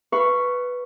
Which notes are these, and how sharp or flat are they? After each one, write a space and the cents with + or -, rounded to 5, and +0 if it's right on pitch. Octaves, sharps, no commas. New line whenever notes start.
B4 +0 F5 -30 C#6 +0